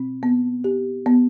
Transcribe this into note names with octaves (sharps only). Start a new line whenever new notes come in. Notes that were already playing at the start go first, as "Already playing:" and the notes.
Already playing: B2 C4
B3
G4
B3